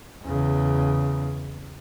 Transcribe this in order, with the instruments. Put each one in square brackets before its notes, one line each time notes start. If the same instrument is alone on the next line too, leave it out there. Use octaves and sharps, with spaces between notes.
[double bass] E2 C#3